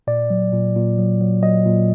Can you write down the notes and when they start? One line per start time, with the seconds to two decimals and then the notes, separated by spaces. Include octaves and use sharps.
0.07 A#2 D5
0.30 F#3
0.52 A#2
0.76 A#2
0.99 F#3
1.21 F#3
1.42 F#3 D#5
1.66 A#2